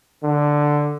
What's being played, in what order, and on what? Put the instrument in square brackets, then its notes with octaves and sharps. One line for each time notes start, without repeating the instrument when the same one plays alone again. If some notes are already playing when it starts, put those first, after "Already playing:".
[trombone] D3